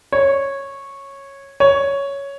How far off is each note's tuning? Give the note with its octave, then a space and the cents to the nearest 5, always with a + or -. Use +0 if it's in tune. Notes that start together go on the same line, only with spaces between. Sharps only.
C#5 -10
C#5 +5